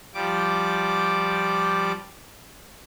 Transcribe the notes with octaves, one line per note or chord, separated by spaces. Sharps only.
F3 G3 D6